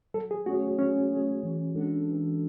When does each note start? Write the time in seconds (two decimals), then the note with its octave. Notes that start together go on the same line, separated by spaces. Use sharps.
0.14 F#3 A4
0.31 G#4
0.46 A3 C#4 F#4 G#4 C#5
0.79 F#3 C#4
1.11 A3 C#4 G#4 C#5
1.43 E3
1.75 G#3 D4 F#4 A4
2.07 E3